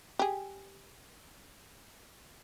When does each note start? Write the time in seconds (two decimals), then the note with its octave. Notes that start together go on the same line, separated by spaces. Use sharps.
0.19 G4 G#4